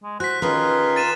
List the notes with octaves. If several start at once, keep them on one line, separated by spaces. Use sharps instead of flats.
G#3
F#4 C5 F#6 B6
D#3 C#4 F4 G#4 A#4 B4 C6
A6 D#7 E7